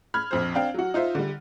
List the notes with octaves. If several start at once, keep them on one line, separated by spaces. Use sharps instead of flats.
B5 F6 G#6
A#1 F2 C5
C4 D4 F5 G5
F#3 F#4
D#4 F4 C5 E5
D3 G3